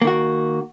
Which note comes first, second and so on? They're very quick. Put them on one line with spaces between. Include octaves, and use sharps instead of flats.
A#3 D#3 F#4